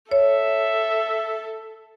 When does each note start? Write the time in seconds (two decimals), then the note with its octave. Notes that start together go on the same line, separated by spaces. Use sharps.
0.11 A4 C#5 E5